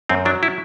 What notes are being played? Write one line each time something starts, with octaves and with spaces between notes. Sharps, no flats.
F#2 C4
F#3 D4
E4